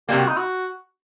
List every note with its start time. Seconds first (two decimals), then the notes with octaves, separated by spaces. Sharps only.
0.09 C3 G3 A#3 G4
0.19 F#4
0.28 D#4
0.37 F#4